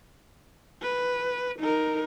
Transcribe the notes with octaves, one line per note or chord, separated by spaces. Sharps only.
B4
D#4 A#4